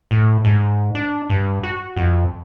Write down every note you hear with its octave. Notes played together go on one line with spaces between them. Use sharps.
A2
G#2
D4
G2
F#4
F2